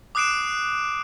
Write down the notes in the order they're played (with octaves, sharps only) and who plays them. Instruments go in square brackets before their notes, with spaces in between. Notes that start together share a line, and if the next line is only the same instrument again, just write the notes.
[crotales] D6 D#6 F#6 C7 D7 E7